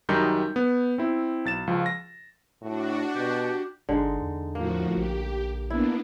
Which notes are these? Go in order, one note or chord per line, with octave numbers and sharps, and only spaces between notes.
F#2 D#3 G3 D#4 G6
B3
C4 E4
B1 A6 E7
C#2 F3
A#6
A2 D4 F#4
B2 G4
G1 D3 G#3 D#4
E2
A2 F3 A#3 F#4
A#1 G4
A#3 B3 D4 E4